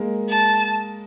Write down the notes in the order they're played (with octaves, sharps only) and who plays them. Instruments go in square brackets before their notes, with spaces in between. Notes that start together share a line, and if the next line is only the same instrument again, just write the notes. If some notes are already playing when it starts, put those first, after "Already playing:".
Already playing: [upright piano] G#3 A#3
[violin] A5